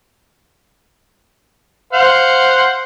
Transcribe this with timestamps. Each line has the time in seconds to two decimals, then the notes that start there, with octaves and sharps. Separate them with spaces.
1.93 C5 F5 F#5